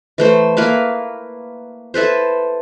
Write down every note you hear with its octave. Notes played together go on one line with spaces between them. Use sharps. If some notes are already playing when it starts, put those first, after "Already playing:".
E3 A3 C5
A#3 E4 B4 F5
E4 A4 B4 C5